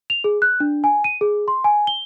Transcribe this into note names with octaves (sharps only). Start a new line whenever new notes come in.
F7
G#4
F#6
D4
G#5
D#7
G#4
C6
G#5
G7